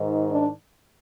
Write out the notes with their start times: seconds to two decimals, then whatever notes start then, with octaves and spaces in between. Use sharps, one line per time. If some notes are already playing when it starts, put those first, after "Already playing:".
Already playing: G#2 D#3
0.29 D4